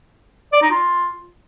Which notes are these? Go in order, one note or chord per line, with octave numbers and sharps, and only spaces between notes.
D5
D#4
F4